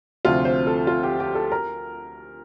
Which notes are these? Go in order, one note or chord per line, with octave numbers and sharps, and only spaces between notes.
D2 C3 F3 F4
C5
A4
F4
G4
G4
A4
A#4